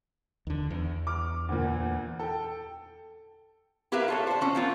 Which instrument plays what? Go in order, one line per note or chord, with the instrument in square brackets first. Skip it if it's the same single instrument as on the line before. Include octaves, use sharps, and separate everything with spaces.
[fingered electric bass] D#2 D3
E2
[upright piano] D6 F6
D2 A#2
A4 G5
[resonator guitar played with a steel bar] E4 G4 A#4 B4 E5 F5
F4 A4 C#5
D4 C5
E3 C#4
A#3 C4 F4